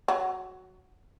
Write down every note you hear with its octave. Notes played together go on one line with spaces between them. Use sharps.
F#3